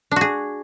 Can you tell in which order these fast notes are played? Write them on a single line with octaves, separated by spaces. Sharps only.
D4 F#4 G#4